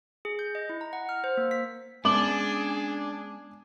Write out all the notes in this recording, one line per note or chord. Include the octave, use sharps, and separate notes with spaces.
G#4
G6
D#5
E4
A#5
F#5
F6
C5
A#3
B6
G#3 B3 C#4 D4 G#4 D6 F#7